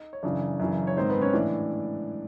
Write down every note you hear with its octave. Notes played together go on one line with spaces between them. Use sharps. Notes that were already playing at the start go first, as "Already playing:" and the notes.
Already playing: D#4
C#5
F#2 C#3 E3 D4 D5
F#2 C#3 E3
C#5
G#2 D#3 C4 C5
B3 B4
C#4 C#5
A2 E3 D4 D5